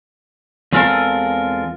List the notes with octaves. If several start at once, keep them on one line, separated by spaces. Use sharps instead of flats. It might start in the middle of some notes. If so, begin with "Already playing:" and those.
E2 G#3 C4 F4 A4 A#4